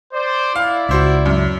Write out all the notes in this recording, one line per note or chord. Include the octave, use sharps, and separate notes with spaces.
C5 D5
E4 D5 F5
C#2 F#4 C5 E5
F#2